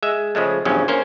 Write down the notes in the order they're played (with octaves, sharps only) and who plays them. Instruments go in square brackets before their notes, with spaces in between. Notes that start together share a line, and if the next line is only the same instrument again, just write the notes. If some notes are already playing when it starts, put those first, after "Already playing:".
[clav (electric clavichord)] G#3 E5
C#3 F3 G#3 A3
E2 G2 C#3 F3 F#3 C#4
A#3 C#4 A#4 C5